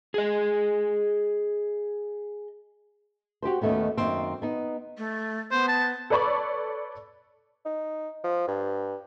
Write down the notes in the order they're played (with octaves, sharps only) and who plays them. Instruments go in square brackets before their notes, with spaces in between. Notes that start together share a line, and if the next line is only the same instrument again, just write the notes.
[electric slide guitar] G#4 D#5
[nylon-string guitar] F#4 G4 B4 C5
D#2 D#3 A3 B3 C#4
F#2 D#3 A#3 C4
B3 D#4
[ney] A3
[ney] B3 [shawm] C5
[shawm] A5
[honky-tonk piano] A4 B4 C#5 D5 B5 C#6
[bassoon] D#4
F3
G2